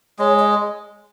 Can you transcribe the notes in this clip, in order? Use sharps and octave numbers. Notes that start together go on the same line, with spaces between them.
G#3 C#5
D#5